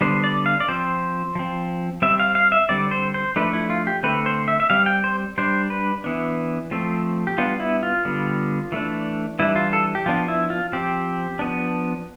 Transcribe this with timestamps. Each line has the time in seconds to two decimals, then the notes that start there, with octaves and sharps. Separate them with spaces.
0.01 D3 G3 B3 D4 C5
0.24 D5
0.46 F5
0.60 D5
0.68 F3 C4 C5
1.35 F3 C4
2.02 G3 C4 E5
2.20 F5
2.35 F5
2.52 E5
2.69 D3 G3 C4 D5
2.91 C5
3.14 C5
3.36 F3 A3 D4 B4
3.53 E4
3.70 F4
3.87 G4
4.03 D3 A3 C4 B4
4.26 C5
4.48 E5
4.60 E5
4.70 G3 C4 F5
4.86 G5
5.04 C5
5.38 G3 D4 C5
5.70 B4
6.04 E3 B3 D4
6.71 F3 A3 C4
7.27 G4
7.38 G3 B3 D4 F4
7.60 E4
7.83 F4
8.05 D3 G3 B3
8.72 E3 A3 D4
9.39 E3 G3 D4 E4
9.56 F4
9.73 A4
9.95 G4
10.06 F3 B3 D4 F4
10.28 E4
10.50 F4
10.72 F3 C4 G4
11.39 F3 B3 D4